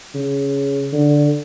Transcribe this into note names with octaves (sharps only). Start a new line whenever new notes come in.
C#3
D3